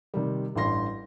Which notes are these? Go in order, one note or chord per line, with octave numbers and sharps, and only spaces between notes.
C3 D#3 G3
A1 G2 C6 A#6